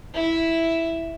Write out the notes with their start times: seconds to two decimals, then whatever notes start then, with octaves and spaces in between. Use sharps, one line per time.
0.15 E4